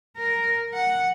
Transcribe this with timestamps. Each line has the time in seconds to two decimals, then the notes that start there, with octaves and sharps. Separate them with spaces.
0.17 A#4
0.74 F#5